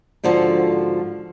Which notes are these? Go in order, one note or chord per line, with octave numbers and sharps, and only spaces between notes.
G#2 D3 F3 F#4 A4